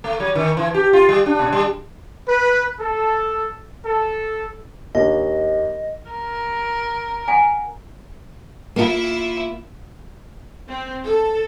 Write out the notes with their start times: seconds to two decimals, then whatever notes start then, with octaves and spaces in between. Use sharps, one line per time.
0.04 A3
0.20 F#3
0.35 D#3
0.57 E3
0.74 G4
0.93 F4
1.09 G3
1.26 D4
1.39 B2
1.52 G3
2.27 B4
2.79 A4
3.86 A4
4.95 D#2 D4 D#5
6.11 A#4
7.28 F#5 G#5
8.76 A#3 E4 F4
10.69 C4
11.05 A4